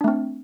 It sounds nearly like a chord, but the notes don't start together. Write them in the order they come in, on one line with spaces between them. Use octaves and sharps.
D4 A3 C4